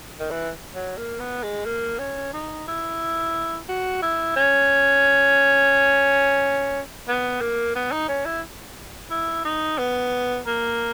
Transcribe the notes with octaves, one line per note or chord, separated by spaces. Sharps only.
D#3
E3
F#3
A#3
B3
G#3
A#3
C#4
D#4
E4
F#4
E4
C#4
B3
A#3
B3
D#4
C#4
E4
E4
D#4
B3
A#3